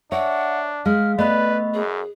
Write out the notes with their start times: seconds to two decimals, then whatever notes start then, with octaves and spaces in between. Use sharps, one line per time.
0.12 D4 C#5 E5 F#5
0.86 G#3 F5 F6
1.19 A3 B3 B4 D5 D#5 B5 F#6
1.74 F#2 G#4